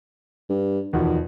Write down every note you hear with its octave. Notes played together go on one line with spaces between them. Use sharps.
G2
E2 B2 D#3 F3